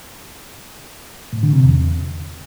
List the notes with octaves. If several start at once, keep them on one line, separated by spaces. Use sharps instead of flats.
A2
D3
C3
E2